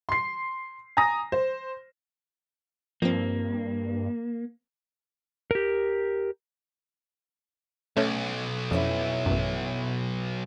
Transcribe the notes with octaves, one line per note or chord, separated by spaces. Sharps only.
C6 C7
G#5 A#5 D#6 A#6
C5
G2 F3 A#3 C4
G4 A#4
B1 A3 C#4 D#5
F2 B3 C#4 E4
A1 F#2